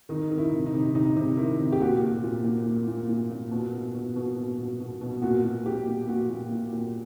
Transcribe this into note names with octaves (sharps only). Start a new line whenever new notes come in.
D#3 D#4
D#3
E4
C3
D#4
C3
C3 D#4
C3
D#3 E4
C3
G4
A#2 F#4
A#2
A#2
A#2
A#2
A#2
A#2
A#2
B2
B2
B2
B2
B2
B2
B2
B2
A#2 F#4
A#2
A#2 G4
A#2
A#2 F#4
A#2
A#2
A#2